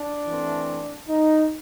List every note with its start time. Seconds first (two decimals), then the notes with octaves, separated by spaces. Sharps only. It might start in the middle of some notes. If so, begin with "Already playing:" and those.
Already playing: D4
0.26 E3 A3 C4
1.07 D#4